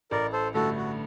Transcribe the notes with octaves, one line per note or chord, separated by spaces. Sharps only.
A1 A#4 D5
A4 C5
G2 D3 A3 F#4 A4
F#4